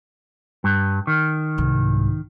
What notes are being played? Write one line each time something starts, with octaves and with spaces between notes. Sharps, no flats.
G2
D#3
C2 G#2